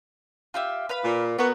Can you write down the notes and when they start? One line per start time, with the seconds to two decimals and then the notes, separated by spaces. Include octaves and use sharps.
0.54 F4 G4 E5
0.89 B4 F5 B5
1.04 A#2
1.38 B3 F#4 A#4